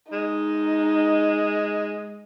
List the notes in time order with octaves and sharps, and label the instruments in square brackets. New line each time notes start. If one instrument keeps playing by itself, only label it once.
[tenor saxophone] G#3 [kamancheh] D#4